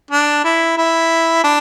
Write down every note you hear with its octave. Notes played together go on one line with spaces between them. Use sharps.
D4
E4
E4
D4